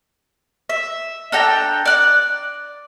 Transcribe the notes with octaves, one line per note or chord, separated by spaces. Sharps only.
E5
D4 A4 G5 A#5
D5 F#6